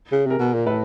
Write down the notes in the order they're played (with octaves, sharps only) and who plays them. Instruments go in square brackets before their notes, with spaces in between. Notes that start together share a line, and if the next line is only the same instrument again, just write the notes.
[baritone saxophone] C#3
[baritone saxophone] C3 [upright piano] G#4 A#4
[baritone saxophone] B2
A#2
[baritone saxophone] A2 [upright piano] A4 B4